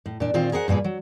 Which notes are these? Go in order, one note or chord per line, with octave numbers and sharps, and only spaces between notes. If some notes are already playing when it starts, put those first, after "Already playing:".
A2
A#2 D4
A#2 D#3 C4 F4
G#4 A#4 C5 D5 F#5
G2 A#2 A#3 G#4 B4
F#3